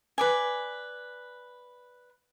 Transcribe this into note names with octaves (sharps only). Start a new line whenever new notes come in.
B4 D5 G#5